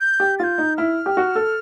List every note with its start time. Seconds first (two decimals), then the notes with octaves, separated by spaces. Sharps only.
0.01 G6
0.20 G4
0.39 F4 G6 A6
0.58 D#4
0.77 E4 F6
1.06 G4
1.17 F#4
1.35 A4